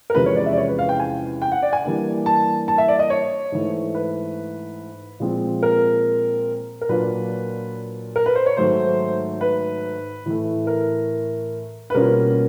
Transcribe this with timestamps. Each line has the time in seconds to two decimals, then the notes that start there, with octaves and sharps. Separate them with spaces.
0.10 A#4
0.15 E2 C3 F3 G#3 C#4 B4
0.26 C#5
0.36 D5
0.46 E5
0.53 D5
0.57 C#5
0.68 B4
0.79 F5
0.89 G5
1.00 G#5
1.42 G5
1.52 F#5
1.62 D5
1.73 G#5
1.84 E3 G3 A#3 D4
2.26 A5
2.68 A5
2.78 E5
2.88 D5
2.99 D#5
3.10 C#5
3.52 G#2 E3 A3
3.95 B4
5.20 A#2 F3 G#3 C4
5.63 A#4
6.81 A#4
6.89 A#2 F#3 A#3 D4 F4 B4
8.16 A#4
8.26 B4
8.36 C5
8.46 C#5
8.57 G#2 D#3 F#3 A3 C5
9.41 B4
10.26 A2 E3 A3
10.67 A#4
11.90 B4
11.94 B2 G3 A#3 C#4 F4 A#4